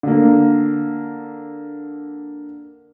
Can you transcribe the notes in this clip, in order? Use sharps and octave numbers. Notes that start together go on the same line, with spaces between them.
D3 A#3